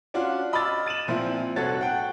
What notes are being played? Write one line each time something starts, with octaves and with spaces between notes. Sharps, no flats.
C#4 D4 F4 F#4
D#5 B5 D6 E6 F6 A6
A6 D#7 E7 F#7
A#2 F3 C4 E4
F1 C2 F#4 A4 C#5 A6
F#5 G5